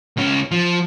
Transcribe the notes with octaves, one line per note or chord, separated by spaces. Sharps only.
C#2 C#4
F3